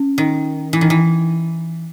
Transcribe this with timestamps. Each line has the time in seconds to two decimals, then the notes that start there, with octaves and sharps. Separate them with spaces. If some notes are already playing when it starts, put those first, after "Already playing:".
Already playing: C#4
0.18 D#3
0.73 E3
0.81 D#3
0.90 E3